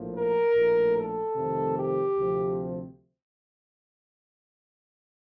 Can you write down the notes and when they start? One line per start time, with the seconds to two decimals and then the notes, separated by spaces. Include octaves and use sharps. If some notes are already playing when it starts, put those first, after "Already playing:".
Already playing: A#1 A2 F3 A#3
0.13 A#4
0.54 A#1 A2 A3
0.95 A4
1.35 F2 C3 D#3 A3 C4
1.76 G4
2.16 D2 C3 F3 C4